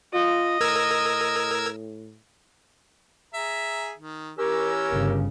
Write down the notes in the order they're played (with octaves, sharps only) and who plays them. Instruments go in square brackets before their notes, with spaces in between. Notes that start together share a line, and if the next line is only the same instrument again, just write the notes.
[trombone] F4 [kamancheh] D#5
[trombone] A2 [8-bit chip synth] A#4 E6 G#6
[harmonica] G#4 E5 A#5
D#3
[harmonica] E3 C#5 E6 [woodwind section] C#4 G4 A#4
[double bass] G1 C#3